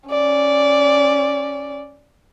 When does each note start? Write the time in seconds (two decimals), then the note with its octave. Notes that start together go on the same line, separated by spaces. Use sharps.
0.10 C#4 D5